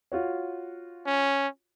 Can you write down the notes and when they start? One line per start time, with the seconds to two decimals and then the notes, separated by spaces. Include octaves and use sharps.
0.12 F4 F#4 C#5
1.06 C#4